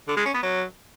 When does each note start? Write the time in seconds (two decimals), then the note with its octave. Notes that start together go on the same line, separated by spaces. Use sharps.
0.08 D3
0.17 G#3
0.25 C#4
0.34 B3
0.43 F#3